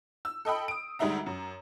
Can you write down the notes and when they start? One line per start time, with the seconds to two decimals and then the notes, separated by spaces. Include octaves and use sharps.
0.25 E6
0.45 A4 D#5 G5 B5
0.68 D#6 D7
0.99 D2 G3 G#3 D#4 E5 A#5
1.26 F#2